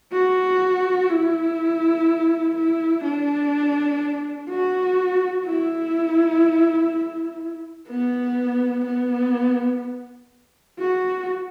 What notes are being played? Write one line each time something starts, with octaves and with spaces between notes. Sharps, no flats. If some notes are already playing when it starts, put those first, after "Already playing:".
F#4
E4
E4
D4
F#4
E4
B3
B3
F#4